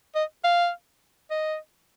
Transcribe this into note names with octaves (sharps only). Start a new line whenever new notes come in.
D#5
F5
D#5